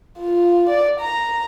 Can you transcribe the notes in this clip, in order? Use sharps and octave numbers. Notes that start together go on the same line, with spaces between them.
F4
D5
A#5